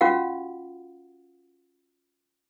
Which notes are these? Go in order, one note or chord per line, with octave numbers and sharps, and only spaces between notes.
C#4 F4 F#4 F5 F#5